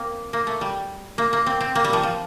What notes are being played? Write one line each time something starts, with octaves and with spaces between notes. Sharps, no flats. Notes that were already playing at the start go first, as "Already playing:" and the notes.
Already playing: A#3 C4
A#3
A3
G3
A#3
A#3
C4
C4
A#3
G3
F3
F3